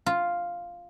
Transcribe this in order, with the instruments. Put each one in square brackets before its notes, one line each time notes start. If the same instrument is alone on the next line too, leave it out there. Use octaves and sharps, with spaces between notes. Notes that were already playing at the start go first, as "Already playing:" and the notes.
[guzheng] F4